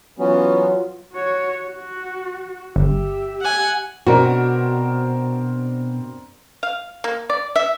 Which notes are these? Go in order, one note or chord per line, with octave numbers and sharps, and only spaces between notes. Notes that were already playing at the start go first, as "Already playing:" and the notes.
E3 F#3 B3 C#4 F4
F#4 C#5
F#4
G1 G4 E5
F#5 G#5
B2 C4 D4 F#4 A#4
F5
A#3
D5
E5